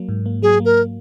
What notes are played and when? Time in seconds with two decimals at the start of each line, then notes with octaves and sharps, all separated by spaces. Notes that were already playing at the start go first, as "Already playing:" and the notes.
Already playing: F#3 A#3
0.09 G#2
0.26 A#3
0.42 F#3 G#4
0.60 A#3
0.65 A#4